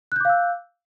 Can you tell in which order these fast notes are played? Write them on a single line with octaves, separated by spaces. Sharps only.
F#6 G6 D6 F5 E6